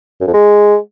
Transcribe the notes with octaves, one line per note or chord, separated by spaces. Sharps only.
F#2
F2
G#3